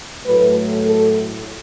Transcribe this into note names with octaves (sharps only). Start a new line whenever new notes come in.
A2 F#3 A3 B4
A4